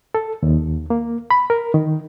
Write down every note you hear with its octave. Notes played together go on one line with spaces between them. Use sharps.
A4
D#2
A#3
B5
A#4
D#3